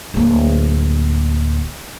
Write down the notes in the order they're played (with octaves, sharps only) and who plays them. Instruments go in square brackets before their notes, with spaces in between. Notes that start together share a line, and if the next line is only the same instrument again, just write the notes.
[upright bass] D1 A#3